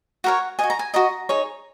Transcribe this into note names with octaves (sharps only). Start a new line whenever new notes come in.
F#4 A#4 C#5 F#5
F#4 D#5 G#5
A#5
G#5
F#4 D#5 A#5
D#4 G#4 C#5